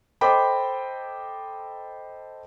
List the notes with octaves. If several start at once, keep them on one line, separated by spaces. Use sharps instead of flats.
A4 C5 D#5 G5 B5 D6